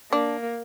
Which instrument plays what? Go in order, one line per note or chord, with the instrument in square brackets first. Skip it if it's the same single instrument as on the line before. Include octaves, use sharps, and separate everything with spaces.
[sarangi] A#3 [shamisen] D4